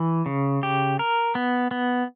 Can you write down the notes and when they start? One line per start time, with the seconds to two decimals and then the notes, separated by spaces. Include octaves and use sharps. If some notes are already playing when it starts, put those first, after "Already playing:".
Already playing: E3
0.26 C#3
0.63 G4
0.99 A#4
1.35 B3
1.71 B3